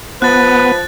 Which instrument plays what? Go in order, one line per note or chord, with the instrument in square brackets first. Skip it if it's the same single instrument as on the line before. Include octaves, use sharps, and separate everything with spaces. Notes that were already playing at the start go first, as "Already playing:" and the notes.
[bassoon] F3 [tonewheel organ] B3 [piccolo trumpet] B4 [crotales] F#6 A6